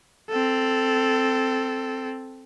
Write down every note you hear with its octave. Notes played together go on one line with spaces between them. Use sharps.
C4 A4